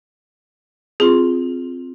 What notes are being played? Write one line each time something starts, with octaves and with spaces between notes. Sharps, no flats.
C4 F4 G#4 C6